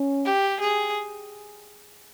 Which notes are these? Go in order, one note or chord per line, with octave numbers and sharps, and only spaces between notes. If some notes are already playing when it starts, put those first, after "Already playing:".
Already playing: C#4
G4
G#4